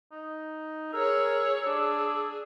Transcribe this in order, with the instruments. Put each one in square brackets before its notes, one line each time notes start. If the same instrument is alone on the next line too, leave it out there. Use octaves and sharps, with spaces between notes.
[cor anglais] D#4
[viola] G#4 C#5 [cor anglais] A#4 [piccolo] E6
[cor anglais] D4 [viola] G#4